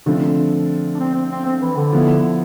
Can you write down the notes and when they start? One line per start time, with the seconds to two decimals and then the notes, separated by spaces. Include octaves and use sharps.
0.06 D3 F3 A3 C4
0.95 D4
1.00 C4
1.15 C4
1.31 C4
1.46 C4
1.62 E3
1.76 D3
1.93 F3 B3 E4